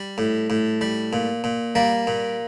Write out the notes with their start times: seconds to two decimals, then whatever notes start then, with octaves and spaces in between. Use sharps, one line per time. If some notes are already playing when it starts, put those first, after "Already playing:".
Already playing: G3
0.18 A2
0.50 A2
0.81 G3
1.13 A#2
1.44 A#2
1.75 G3 A#3
2.07 A#2